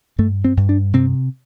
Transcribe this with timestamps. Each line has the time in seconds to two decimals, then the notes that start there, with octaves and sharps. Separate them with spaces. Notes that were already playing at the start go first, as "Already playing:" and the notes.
0.19 G2 A3
0.44 C4
0.57 G2
0.69 D4
0.93 C3 C4